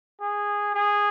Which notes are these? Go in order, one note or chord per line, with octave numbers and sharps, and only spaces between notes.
G#4
G#4